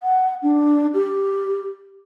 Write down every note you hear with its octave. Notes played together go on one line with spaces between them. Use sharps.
F#5
D4
G4